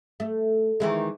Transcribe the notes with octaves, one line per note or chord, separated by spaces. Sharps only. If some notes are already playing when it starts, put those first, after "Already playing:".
A3
D#3 E3 G#3